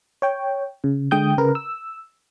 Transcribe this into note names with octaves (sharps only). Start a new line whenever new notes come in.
C#5 G5
C#3
D3 G#3 G5 D#6 G6
C#3 A#4 B4
E6